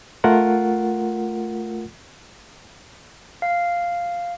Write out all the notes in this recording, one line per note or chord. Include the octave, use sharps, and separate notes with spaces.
A3 F4 A#4 F#5
F5